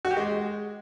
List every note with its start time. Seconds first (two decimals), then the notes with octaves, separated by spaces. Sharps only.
0.05 F#4
0.11 G4
0.17 G#3